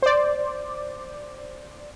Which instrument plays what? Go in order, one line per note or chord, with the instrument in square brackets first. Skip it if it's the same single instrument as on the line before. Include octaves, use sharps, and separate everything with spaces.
[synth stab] C5 D5